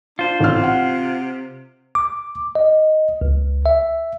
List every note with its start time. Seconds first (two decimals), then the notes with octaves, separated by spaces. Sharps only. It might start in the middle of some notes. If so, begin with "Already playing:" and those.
0.19 D4 F4 C5
0.40 A1 C3 F6
0.63 F#5
1.95 D6
2.55 D#5
3.21 C#2
3.66 E5